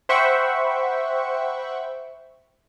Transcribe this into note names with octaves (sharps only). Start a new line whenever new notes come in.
C5 E5 F#5 G5 B5 C#6